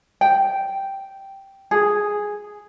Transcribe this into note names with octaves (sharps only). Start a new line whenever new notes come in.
G5
G#4